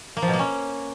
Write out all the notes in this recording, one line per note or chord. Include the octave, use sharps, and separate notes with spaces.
A#3
F3
B2
A#3
C#4